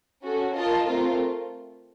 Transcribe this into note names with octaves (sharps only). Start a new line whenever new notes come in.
C#4 F#4 A4
F4 A#4 D#5 A5
A3 C4 F4 A#4